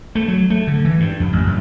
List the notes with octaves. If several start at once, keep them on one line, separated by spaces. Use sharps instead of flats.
A3
F#3
A3
D3
E3
G2
F2
A1
F#2